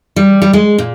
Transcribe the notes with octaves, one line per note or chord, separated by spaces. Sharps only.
G3
G3
G#3
A#2